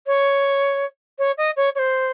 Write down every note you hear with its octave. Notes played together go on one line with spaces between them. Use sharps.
C#5
C#5
D#5
C#5
C#5
C5